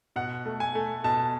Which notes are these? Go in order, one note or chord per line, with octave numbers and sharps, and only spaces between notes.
B2 F#5
A3
G#5
A3
B2 A5